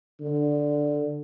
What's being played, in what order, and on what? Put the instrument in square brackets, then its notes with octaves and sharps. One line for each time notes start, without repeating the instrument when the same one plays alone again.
[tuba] D3